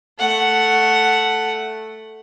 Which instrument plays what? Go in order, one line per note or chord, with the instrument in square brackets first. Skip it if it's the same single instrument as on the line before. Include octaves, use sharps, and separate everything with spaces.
[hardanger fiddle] A3 F#5